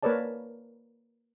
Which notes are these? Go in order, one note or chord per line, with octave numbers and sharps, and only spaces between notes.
A#3 A#4 B4 C#5 D5 A5